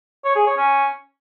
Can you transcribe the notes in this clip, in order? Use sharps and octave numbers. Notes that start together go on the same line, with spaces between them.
C#5
G#4
C#5
C#4